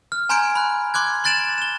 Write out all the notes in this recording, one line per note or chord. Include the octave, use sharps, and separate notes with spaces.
F6
G#5 A#5 C6 G6 G#6 D7
B5 F#6
C6 D6 F#6 G#6
C6 F#6 A6 D7 E7 F#7
E7 G7